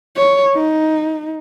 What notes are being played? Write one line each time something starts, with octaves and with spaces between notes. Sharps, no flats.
C#5
D#4